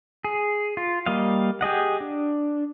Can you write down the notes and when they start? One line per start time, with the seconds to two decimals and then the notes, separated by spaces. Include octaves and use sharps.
0.24 G#4
0.77 F4
1.06 G3 A#3 D#5 F5
1.61 G4 G#4 D#5 F#5
2.00 D4